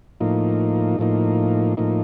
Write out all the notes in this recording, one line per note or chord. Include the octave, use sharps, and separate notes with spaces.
A2 F3 A#3 D#4
A2 F3 A#3 D#4
A2 F3 A#3 D#4